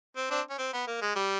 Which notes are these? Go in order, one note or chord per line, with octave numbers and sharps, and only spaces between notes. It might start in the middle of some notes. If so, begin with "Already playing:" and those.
C4
C4 D4
C#4
C4
B3
A#3
G#3
G3